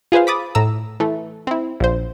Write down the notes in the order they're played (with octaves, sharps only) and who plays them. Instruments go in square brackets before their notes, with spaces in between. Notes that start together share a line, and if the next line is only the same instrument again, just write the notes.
[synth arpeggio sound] F4 G#4 B4 C5 F5
B5 D6 D#6 A6
A2 A#5 E6
E3 A3
C4 E4
A#1 C5